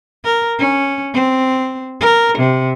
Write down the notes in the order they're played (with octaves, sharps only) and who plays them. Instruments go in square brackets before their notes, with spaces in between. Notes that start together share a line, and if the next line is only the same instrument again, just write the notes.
[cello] A#4
C#4
C4
A#4
C3